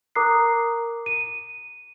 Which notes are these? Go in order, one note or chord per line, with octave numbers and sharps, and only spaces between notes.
A#4 A#5 D6 D#6 F#6 C7
D#7